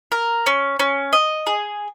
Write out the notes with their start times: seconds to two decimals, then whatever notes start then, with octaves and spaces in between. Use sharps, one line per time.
0.12 A#4
0.46 C#4
0.79 C#4
1.13 D#5
1.47 G#4